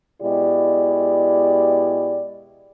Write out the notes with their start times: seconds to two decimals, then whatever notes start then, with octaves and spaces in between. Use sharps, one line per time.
0.21 B2 G#3 E4 G4 D5